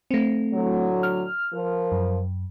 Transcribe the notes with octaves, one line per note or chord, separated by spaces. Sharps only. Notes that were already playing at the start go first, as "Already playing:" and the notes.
A3 C4
A2 D3 F#3
F6
F3 A#4
F#2